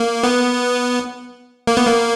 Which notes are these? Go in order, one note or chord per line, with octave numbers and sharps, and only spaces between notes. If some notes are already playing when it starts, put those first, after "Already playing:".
Already playing: A#3
B3
A#3
B3
A#3